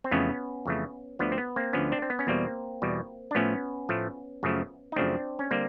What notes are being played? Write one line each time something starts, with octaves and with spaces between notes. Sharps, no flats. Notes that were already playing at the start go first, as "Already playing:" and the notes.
C4
F2 C#3 E3 A3 B3 C#4
F2 C#3 E3 A3
D2 D3 F3 B3
C4
B3
A#3 C4
D2 D3 F3 B3 C#4
C4 D4
C4
B3
C#4
E2 B2 G3 A#3 C4
E2 B2 G3
D4
A2 F3 A3 B3 C#4
A2 F3 A3
F#2 C#3 F3 A3
D#4
F#2 C#3 F3 A3 C4 D4
C#4
D3 G3 A#3 C4